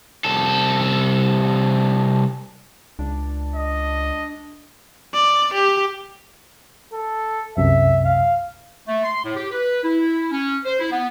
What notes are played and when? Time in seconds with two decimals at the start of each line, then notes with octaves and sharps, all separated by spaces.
0.24 C2 A4
2.99 C#2 D4
3.56 D#5
5.14 D5
5.54 G4
6.93 A4
7.57 C2 F#2 C3 E5
8.05 F5
8.87 A3
9.03 C6
9.24 A2
9.36 G4
9.51 B4
9.82 E4
10.31 C#4
10.65 C5
10.79 E4
10.91 B3